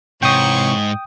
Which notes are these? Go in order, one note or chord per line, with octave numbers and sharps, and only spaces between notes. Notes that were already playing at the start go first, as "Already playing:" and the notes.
G#2 C3 E3 C#5 G5 C#6 D#6